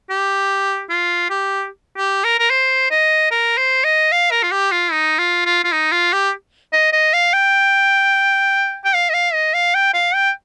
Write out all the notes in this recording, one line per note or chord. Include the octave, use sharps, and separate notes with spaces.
G4
F4
G4
G4
A#4
A#4
C5
D#5
A#4
C5
D#5
F5
A#4
F4
G4
F4
D#4
F4
F4
F4
D#4
F4
G4
D#5
D#5
F5
G5
G5
F5
D#5
F5
D#5
F5
G5
F5
G5